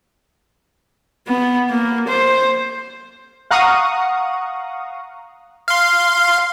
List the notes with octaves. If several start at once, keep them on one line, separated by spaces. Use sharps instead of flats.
B3
A#3
C5
F5 F#5 A#5 C#6 D#6
F5 C6